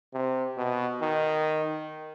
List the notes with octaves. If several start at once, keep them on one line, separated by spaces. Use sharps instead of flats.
C3
B2
D#3